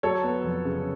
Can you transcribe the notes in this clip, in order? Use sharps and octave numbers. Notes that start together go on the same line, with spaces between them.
F#3 A4 C#5
B3
F2
C#3